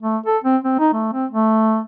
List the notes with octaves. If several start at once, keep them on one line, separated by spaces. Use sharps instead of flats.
A3
A4
C4
C4
D#4
A3
C4
A3